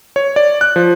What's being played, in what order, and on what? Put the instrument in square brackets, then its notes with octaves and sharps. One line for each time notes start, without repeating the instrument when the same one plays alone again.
[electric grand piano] C#5
D5
F#6
F3